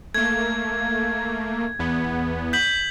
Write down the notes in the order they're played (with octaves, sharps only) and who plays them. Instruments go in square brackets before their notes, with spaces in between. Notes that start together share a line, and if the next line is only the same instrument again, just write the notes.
[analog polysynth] A3 A#3 [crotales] G#6
[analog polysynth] E2 B3
[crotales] G6 B6 F#7